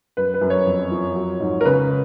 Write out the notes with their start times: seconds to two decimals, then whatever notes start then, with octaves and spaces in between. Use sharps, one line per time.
0.17 F#2 B4
0.34 B4
0.41 F#2
0.50 C#5
0.67 F2
0.92 F3
1.15 F#3
1.40 G#2
1.61 A#4
1.65 C#3 B4